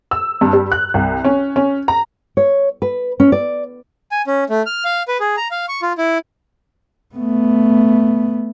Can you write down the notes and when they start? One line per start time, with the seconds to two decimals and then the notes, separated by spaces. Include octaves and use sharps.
0.11 E6
0.41 G2
0.53 G3
0.72 F#6
0.94 C2
1.25 C#4
1.56 C#4
1.88 A#5
2.37 C#5
2.82 B4
3.20 C#4
3.32 D5
4.11 G#5
4.27 C#4
4.50 A3
4.66 F6
4.85 F5
5.08 B4
5.20 G#4
5.37 A#5
5.51 F5
5.68 C#6
5.82 F4
5.98 E4
7.15 A3 B3